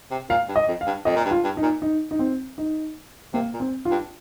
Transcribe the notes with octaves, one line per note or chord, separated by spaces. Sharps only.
C3
A#2 F5
G2
D#5
F2
F5
G2
F2 D#5
A#2
G2
F4
G2
D#4
A#2
D#4
D#4
C4
D#4
C3 A#3
A#2
C4
F4
G2